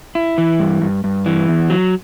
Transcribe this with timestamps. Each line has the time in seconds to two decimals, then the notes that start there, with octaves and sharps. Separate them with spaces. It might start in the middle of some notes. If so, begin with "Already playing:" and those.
0.15 E4
0.38 E3
0.60 G2
0.82 G2
1.04 G2
1.26 E3
1.48 E2
1.70 F#3